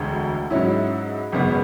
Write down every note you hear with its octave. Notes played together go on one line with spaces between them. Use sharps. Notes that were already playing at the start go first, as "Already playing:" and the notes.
Already playing: E1 D2 D3 G#3
G#2 F#3 C#4 E4
G#1 F#2 C#3 G#3 B3